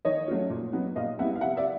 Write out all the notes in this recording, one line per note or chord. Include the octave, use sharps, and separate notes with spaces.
D#3 C#5 D#5
F#3 A3 C#4 F4
A#2
F#3 B3 D#4
A#2 D#5 F5
G3 B3 E4 E5 F#5
F5
C3 E5 F#5
D5 E5